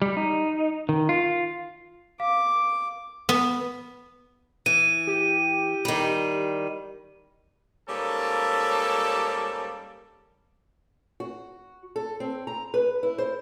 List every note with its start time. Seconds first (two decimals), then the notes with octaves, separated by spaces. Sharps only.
0.02 G3
0.17 D#4
0.89 D#3
1.09 F4
2.20 F5 D6
3.29 B3
4.66 E3 D#7
5.07 G4
5.85 D#3 G3
7.88 G#2 G3 A#3 C#4 A4
11.20 F#4
11.96 A4
12.20 C4
12.47 A#5
12.74 B4
13.03 E4
13.18 C5